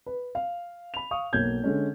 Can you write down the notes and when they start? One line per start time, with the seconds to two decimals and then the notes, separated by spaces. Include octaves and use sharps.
0.06 B4
0.35 F5
0.94 B5 F7
1.11 F5 C#6 D#6
1.33 B1 A#3 C#5 G6 G#6
1.64 D3 G#3 C#4